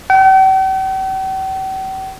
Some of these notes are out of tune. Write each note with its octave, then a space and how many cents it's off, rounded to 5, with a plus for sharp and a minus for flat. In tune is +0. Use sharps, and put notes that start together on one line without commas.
G5 -45